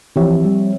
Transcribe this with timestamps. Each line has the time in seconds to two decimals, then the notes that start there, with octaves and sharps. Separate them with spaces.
0.16 E3 F3 C4 G4 C#5 E5
0.45 G3